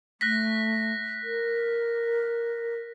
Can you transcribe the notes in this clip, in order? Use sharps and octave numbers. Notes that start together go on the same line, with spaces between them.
A3 F#6 A#6 B6
A#4